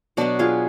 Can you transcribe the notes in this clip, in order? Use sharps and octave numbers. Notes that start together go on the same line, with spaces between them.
B2 F#3 B3 D4 F#4
F4 G#4